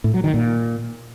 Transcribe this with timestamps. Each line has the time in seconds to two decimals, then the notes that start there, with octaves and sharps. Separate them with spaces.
0.04 A2
0.14 F#3
0.24 D#3
0.34 A#2